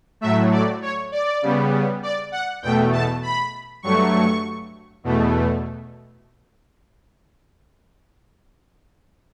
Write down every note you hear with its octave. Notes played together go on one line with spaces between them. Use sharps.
A2 F#3 A3 E5
D5
C#5
D5
C#3 G3 B3
D5
F#5
E2 B2 A3 G5
A5
B5
G2 F#3 A3 C#6
E2 B2 A3